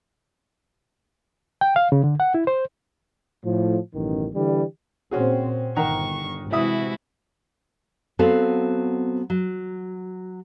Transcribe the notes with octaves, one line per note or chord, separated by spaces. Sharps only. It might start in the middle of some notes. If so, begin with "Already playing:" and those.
G5
F5
C#3
D3
F#5
E4
C5
A2 F3
A1 F#2 B2 D#3
D3 E3 G3
A#2 C4 C#4 F#4 G#4
G1 D#3 F#5 A#5 C#6
C3 E3 G#3 E4 F#4 E5 D#6
F#3 B3 C4 F#4 A4 F5
F#3